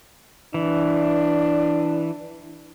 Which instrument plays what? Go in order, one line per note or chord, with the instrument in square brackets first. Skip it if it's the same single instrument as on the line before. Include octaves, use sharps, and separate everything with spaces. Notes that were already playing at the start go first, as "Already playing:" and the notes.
[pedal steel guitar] E3 [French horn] D4